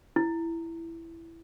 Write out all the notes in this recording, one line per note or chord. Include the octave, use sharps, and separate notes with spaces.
E4